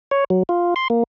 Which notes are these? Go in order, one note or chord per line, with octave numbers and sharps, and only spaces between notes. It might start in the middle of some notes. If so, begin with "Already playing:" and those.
C#5
F#3
F4
C6
A#3